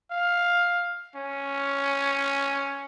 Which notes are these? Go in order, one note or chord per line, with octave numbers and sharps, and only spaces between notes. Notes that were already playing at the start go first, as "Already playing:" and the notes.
F5
C#4